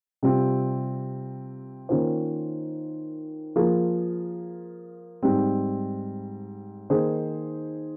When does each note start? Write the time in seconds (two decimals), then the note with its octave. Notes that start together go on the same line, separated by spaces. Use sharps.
0.23 C3 G3 C4 F4
1.89 D#3 A#3 C#4 F4 C5
3.56 F3 A#3 F4 G#4
5.23 G#2 G3 C4
6.90 D#3 A#3 D#4 G#4 C5